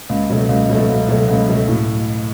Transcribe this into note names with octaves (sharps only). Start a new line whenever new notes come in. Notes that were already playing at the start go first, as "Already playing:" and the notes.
C#2
B2 F#3 A3
C#2
B2 F#3 A3
C#2
B2 F#3 A3
C#2
B2 F#3 A3
A2